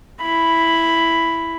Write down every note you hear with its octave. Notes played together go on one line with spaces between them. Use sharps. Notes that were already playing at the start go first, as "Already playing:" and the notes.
E4 B5